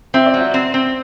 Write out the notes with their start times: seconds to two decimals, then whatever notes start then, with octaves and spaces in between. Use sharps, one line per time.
0.14 C4 E5
0.26 D5
0.34 F#3 E5
0.54 C4
0.74 C4